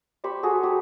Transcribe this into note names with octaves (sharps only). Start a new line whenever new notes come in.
G4 C5 B5 C#6
F#4 G#4 A4
G4